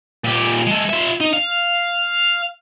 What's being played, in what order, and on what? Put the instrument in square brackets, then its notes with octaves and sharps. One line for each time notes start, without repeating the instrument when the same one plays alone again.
[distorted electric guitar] A#2 G4
G#3 A4
F4 E5
D#4
F5